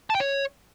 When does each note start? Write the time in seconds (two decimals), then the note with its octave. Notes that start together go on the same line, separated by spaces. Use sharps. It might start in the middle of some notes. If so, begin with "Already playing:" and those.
0.10 A5
0.15 G5
0.20 C#5